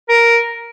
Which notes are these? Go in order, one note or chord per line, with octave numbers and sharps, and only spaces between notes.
A#4